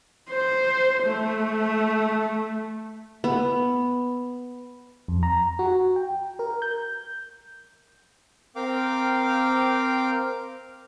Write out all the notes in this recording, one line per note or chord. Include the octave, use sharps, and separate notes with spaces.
C5
A3
B3
F2
A#5
F#4
G5
A#4
G6
C4 A#4 F5 G5 D6